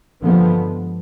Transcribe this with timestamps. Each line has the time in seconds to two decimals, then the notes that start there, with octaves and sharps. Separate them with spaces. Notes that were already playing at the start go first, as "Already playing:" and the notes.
0.23 G2 D3 F3 G#3 B3